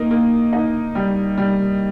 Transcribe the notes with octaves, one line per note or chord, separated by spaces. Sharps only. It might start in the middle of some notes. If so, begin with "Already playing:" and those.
Already playing: A#3 D#4
A#3
D#4
G3
G3